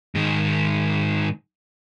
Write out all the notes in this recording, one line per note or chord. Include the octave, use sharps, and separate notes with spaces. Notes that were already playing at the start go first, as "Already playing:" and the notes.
G#2 D#3